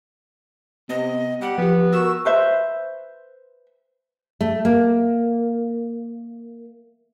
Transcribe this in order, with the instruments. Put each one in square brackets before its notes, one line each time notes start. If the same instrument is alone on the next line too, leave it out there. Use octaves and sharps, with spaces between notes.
[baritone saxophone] C3 [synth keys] B3 [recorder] D#5
[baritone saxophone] G3 [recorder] F#5
[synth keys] F3 G4 [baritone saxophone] B3
[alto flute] F#4 [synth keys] A#4 [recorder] E6
[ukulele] B4 C5 E5
[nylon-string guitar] A3
A#3